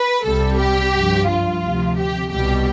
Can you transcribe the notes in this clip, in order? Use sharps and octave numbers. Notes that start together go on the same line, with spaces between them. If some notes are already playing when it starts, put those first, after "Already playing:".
Already playing: B4
C2 C3 G3 A4
G4
G2 F3
F4
D2 C3 F3
G4
C2 B2 G3 G4